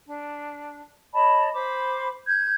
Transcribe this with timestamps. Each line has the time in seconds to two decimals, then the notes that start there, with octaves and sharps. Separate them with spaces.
0.07 D4
1.14 C#5 D#5 A5 B5
1.53 C5 B5 D6
2.27 G6 G#6